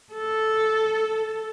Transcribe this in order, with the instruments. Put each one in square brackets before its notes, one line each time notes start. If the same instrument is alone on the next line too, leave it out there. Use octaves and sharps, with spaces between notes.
[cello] A4